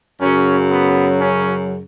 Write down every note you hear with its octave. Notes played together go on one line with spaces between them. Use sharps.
F#2 C#3 F#3 C#4
B3
C#4